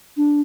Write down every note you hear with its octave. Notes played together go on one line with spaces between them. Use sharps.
D4